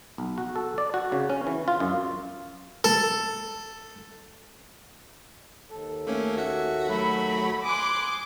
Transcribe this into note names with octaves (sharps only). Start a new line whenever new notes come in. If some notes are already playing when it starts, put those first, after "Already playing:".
B1
F#4
A4
D5
F#4
C#3
C#4
E3
F4
F#2
A4
D#2 A4
A3 A#3 C#4
F#4 E5 F#5
F#3 A3 F#4 B5
G#5 C6 D6 D#6 F#6